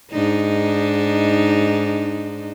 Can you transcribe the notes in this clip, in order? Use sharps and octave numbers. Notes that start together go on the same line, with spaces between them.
G#2 D4 D#4